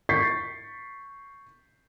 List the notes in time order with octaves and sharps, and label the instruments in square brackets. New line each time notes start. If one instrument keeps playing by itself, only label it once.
[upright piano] C#6 G6 A6 B6 C7